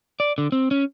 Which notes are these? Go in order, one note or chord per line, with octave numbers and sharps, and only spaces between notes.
D5
D3
C4
C#4